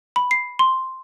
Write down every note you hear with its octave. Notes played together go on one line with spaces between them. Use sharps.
B5
C7
C6